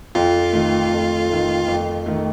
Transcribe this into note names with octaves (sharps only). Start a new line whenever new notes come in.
F2 F4
D#3 A3
F2
D#3 A3
F2
D#3 A3